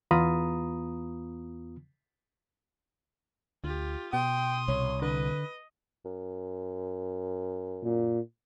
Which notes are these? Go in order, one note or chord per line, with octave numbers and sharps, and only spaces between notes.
E2 B3 F4 A#5 B5 D#6
D2 F4 G4
B2 G5 C6 D#6
C2 C#5
D3 B4 D#5
F#2
A#2